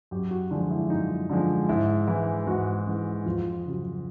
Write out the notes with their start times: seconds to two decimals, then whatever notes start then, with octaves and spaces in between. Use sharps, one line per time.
0.11 F#2 G4
0.31 F#4
0.51 D3 F3 G#3 F4
0.71 E4
0.90 F#2 D#4
1.30 D3 F3 G#3
1.69 G#2 E4
2.07 E3 G#3 E4
2.47 G#2 F#4
2.87 E3 G#3
3.26 F2 F4
3.66 C#3 F#3